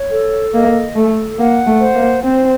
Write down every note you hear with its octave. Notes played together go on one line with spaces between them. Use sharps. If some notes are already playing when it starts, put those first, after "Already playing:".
Already playing: C#5
A4
A#3 D#5
A3 A4
A#3 F#5
A3
C5
A#3
C4 C5